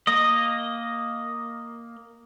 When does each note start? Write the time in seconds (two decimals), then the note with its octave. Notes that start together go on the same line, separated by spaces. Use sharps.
0.07 A#3 D#5